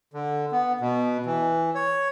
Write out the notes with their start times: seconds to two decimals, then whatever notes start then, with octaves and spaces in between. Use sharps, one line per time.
0.13 D3
0.52 B3
0.81 B2
1.26 E3
1.75 C#5